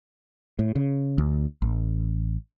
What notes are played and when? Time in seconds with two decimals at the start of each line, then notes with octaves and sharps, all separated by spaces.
0.59 A2
0.75 C#3
1.18 D2
1.62 A1